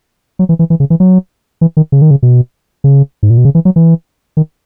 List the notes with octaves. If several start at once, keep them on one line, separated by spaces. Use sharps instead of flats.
F#3
E3
E3
E3
C#3
E3
F#3
E3
D#3
C#3
D#3
C#3
B2
C#3
G#2
A#2
B2
C#3
E3
F#3
E3
D#3